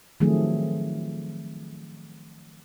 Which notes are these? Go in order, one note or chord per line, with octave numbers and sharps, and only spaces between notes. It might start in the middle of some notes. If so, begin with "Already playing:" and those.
D#3 F3 F#3 A3 C4 G#4